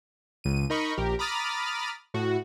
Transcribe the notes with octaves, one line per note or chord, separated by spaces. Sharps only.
C#2 D#7
D#4 A#4 D#5 B5 C#6
A#1 G4 A#4
A#5 B5 D6 D#6 F6 A6
A2 F#4